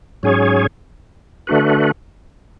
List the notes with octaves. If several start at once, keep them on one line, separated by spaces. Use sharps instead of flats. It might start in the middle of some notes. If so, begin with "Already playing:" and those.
G#2 F#3 C#4 G#4 C#5
D3 A3 D4 F#4 B4